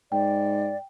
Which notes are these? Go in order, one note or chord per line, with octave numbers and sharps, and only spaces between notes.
G#2 D5 G5